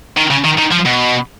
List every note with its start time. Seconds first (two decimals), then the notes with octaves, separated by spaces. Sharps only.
0.17 D#3
0.30 C#3
0.44 D#3
0.58 D#3
0.71 F3
0.85 B2